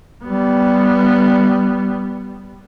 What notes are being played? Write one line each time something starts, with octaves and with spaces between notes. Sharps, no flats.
G3 B3